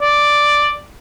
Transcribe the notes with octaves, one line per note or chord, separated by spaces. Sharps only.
D5